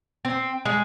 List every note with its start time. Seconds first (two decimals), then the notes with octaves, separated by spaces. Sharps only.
0.25 C4
0.65 G#3